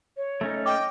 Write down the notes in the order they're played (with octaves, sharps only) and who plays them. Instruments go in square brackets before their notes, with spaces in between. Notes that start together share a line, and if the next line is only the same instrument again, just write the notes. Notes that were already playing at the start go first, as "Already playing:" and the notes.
[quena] C#5
[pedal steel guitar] A3 C#4 D#4
[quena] D#5 [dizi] G5 [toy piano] D6